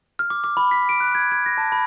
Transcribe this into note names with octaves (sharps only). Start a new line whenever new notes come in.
F6
D6
D6
B5
B6
D7
F#6
G#6
G#6
A#6
A5
B5